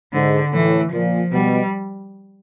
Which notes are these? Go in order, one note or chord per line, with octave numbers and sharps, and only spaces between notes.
G#2 D3
A2 E3
A#2 F3
B2 G3